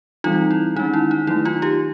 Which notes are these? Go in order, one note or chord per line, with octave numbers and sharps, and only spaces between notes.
E3 G3 C4 D#4 F4
E4
D#3 G#3 C#4 D#4
E4
D#4
D#3 F#3 A3 E4
D#4 F4
F4 G4